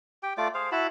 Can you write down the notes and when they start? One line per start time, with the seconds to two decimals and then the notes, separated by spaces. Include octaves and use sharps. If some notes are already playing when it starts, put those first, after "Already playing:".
0.23 G4 G5
0.38 A3 F4 D5 D6
0.54 G#4 C5 F5
0.72 E4 F#4 A5 B5